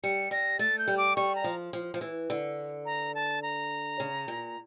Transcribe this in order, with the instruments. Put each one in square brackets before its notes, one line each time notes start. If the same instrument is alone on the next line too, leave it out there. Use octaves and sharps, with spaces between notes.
[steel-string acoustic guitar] G3 [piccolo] C#7
[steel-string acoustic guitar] G3 [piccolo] A#6
[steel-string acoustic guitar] A3 [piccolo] A6
[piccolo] G6
[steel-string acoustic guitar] G3
[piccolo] D6
[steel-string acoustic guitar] G3 [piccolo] C#6
[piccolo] A#5
[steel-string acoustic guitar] F3
F3
F3
E3
D3
[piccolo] A#5
A5
A#5
[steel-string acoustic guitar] C#3
A#2